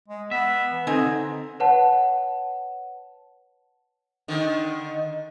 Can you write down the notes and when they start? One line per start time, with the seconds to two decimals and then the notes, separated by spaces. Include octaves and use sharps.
0.08 G#3
0.31 B3 E5
0.71 E3
0.87 D3 C4 D#4 G#5
1.60 B4 C#5 F#5 A5
4.28 D3 D#3